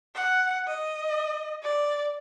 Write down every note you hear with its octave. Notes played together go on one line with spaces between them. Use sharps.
F#5
D#5
D5